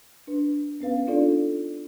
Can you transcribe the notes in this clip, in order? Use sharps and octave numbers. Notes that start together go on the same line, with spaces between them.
D4 B4
B3 C#4 B4 F5
D4 D#4 F4 A4 D5